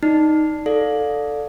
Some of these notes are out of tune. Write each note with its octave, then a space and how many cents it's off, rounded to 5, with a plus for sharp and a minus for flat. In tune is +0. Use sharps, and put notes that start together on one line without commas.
D#4 +0 D5 +0
A4 +0 D5 +0 F5 +30